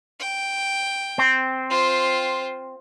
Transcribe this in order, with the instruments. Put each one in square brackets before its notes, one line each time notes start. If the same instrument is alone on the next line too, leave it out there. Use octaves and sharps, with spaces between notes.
[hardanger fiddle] G5
[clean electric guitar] C4
[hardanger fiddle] F4 C5